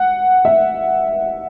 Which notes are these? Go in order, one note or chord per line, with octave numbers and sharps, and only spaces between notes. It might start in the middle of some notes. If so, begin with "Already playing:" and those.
Already playing: F#5
E5